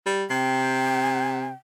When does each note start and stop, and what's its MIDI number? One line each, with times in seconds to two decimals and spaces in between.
0.06 0.24 55
0.30 1.51 48
0.30 1.52 79